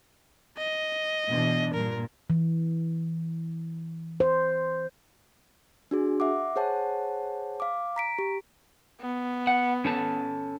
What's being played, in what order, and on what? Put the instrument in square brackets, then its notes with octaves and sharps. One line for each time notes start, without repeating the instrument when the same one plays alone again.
[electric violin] D#5
[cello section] B2 E3 D4
[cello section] G2 A#2 [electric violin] A#4
[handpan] E3
C5
[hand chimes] D4 F#4 G#4
E5 F#5 D6
G#4 C5 C#5 F#5 A5
F5 D6
A#5 B6 D7
G4
[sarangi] B3
[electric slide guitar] F#5
C#4 A4 A5